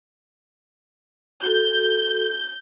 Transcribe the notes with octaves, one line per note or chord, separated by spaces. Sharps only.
F#4 A4 G6